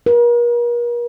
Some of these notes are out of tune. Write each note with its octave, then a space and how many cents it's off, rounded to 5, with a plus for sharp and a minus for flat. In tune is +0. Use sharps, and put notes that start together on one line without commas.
A#4 +40